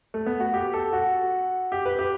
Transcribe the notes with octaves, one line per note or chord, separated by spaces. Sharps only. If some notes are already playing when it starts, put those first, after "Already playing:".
A3
B3
F#4
G4
A4
F#4
G4
B4
G4